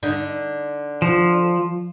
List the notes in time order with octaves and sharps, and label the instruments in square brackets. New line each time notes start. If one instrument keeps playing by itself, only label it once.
[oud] D3 D#4
[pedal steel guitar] F3